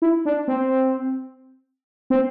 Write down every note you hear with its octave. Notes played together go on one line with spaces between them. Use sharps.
E4
D4
C4
C4